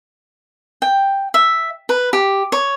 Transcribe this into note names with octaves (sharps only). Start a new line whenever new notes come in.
G5
E5
B4
G4
C#5